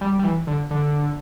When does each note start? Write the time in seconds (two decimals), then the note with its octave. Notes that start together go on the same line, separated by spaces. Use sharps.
0.01 G3
0.19 G3
0.24 E3
0.47 D3
0.71 D3